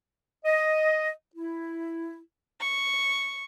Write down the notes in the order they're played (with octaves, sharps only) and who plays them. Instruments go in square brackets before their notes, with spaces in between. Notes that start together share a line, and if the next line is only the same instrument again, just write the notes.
[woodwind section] D#5
E4
[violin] C#6